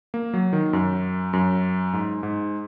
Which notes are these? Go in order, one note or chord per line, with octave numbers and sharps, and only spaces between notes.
A#3
F#3
D#3
F#2
F#2
G#2
G#2